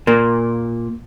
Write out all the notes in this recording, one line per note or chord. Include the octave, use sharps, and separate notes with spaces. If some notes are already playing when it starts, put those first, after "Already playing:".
A#2 A#3